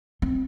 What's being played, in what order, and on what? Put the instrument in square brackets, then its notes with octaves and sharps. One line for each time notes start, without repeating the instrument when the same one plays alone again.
[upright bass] C4